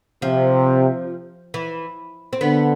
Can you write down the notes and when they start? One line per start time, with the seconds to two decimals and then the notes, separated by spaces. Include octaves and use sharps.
0.22 C3 F3
1.54 E3
2.33 C4
2.41 D3 B3